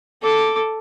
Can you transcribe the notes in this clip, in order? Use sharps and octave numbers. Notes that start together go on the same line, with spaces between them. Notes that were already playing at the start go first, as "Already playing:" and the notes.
A4 D6